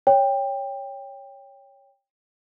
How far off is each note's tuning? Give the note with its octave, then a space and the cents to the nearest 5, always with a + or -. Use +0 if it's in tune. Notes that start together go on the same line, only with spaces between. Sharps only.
C#5 +0 G5 +15